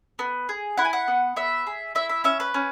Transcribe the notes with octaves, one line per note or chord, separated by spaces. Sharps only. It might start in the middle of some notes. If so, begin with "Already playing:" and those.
B3
G#4
E4 F#5
G#5
F#5
B3
B3 E5
G#4
E4 E5
E5
C#4 E5
B4
C#4